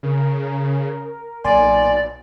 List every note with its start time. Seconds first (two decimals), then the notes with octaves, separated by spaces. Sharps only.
0.03 C#3 A#4
1.45 B1 A#2 D5 G#5 C6